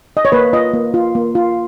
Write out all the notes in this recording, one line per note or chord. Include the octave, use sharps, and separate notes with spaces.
D#5
C#5
A#3 B4
F4 D#5
A#3
F4
A#3
F4